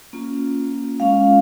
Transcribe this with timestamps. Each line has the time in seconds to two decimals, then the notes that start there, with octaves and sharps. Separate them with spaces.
0.13 A#3 C#4 F4
1.00 G#3 C#4 F4 F5